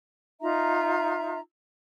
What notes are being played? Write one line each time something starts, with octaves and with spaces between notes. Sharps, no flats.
D#4 F4 E5 A#5